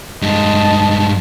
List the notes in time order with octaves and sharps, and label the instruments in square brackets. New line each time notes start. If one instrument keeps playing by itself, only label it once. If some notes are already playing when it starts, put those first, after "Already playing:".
[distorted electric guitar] G2 G#3 [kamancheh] D#5 A5